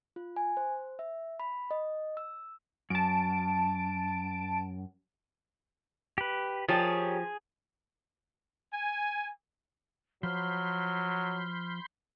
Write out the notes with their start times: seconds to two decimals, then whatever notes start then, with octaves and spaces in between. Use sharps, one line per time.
0.16 F4
0.36 G#5
0.57 C5
0.99 E5
1.40 B5
1.71 D#5
2.17 E6
2.90 F#2 A5 D7
6.18 G4 B4
6.68 F3 G4 G#4 A#4 C#5
8.73 G#5
10.23 F3 F#3 C5 B5 C6 F6 G6